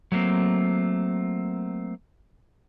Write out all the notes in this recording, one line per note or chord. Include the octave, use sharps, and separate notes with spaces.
F#3 A3 A#3 C4